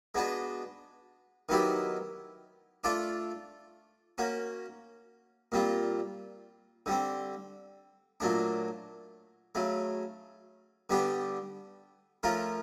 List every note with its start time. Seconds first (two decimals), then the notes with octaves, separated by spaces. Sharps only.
0.15 G#3 B3 D4 F#4 B4
1.49 D#3 F#3 B3 E4 G4
2.84 A3 D4 F4 A4 D5
4.18 A#3 C#4 F#4
5.52 A#2 G3 C4 F4
6.86 D3 G3 C4
8.20 A#2 F#3 A3 D4
9.55 C#3 F#3 A3
10.90 D3 G3 B3 D4 G4
12.23 F3 A3 C#4 F4 A#4